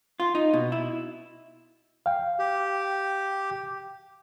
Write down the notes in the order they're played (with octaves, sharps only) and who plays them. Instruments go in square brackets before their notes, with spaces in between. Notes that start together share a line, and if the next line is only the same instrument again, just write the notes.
[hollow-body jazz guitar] F4
D#4
B2
E4
[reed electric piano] F5 G5
[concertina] G4